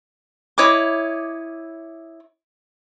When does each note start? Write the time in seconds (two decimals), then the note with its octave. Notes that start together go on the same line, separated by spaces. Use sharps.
0.58 E4 C#5 D#5 D6